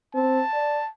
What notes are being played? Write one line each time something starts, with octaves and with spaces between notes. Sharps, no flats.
C4 A5
D5